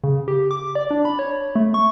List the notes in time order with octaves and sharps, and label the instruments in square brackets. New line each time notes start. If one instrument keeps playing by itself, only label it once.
[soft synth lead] C#3
G4
D6
D5
D4
B5
C#5
A3
C#6